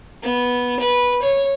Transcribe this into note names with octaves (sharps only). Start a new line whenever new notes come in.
B3
B4
C#5